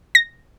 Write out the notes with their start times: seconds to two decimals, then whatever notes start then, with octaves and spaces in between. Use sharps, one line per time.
0.15 A#6